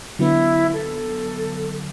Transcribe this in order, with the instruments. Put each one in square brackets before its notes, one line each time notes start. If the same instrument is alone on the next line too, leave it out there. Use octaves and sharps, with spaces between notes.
[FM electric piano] D3 F#3 B3 [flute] E4
[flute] A4